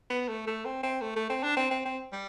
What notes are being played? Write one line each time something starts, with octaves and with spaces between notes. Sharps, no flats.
B3
A3
A3
C4
C4
A3
A3
C4
D4
C4
C4
C4
G3